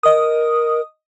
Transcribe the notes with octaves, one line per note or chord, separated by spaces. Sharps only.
A#4 D#5 D#6